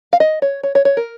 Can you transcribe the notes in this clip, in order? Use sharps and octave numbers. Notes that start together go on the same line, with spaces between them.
F5
D#5
C#5
C#5
C#5
C#5
A#4